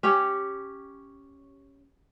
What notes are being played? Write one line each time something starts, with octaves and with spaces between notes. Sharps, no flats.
C#4 G4 C#5